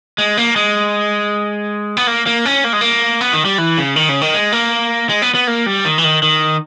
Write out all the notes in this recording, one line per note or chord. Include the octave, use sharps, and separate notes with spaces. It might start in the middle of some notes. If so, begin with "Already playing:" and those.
G#3
A#3
G#3
B3
A#3
A#3
C#4
A#3
G#3
A#3
B3
D#3
G3
E3
C#3
D#3
C#3
D#3
G#3
A#3
G#3
B3
B3
A#3
G3
D#3
E3
D#3
D#3